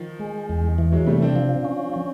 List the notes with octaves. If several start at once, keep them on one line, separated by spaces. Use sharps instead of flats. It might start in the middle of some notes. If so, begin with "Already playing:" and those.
Already playing: D#3 F3
G#3
E2
E3
F#3 G#3
C3 G3 A3
C4 D4
F3
C#4
C#4